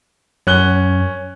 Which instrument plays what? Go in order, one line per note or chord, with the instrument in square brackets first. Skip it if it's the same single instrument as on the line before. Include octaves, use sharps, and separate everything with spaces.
[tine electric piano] F#2 [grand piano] C#4 F#6 G7